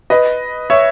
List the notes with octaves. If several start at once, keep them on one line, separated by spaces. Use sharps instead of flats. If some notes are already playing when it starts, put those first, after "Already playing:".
B4 D#5
C#5 E5